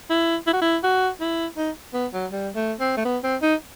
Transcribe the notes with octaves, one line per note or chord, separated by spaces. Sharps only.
E4
E4
F#4
E4
F#4
E4
D#4
B3
F#3
G3
A3
C4
A3
B3
C4
D#4